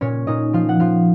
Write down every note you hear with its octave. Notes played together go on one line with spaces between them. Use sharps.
A#2 C#4 C#5
A#2 D#4 D#5
F3 F4 F5
F#5
F3 F4 F5